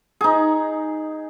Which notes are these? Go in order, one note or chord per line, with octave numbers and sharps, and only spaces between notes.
D#4 G#4